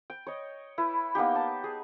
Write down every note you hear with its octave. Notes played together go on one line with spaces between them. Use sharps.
G5
C#5 D#5
E4 B4
A#3 B3 D#4 G4
A5
G#4